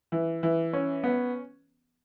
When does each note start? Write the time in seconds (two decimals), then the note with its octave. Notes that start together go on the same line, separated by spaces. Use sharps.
0.12 E3
0.43 E3
0.73 C#4
1.04 B3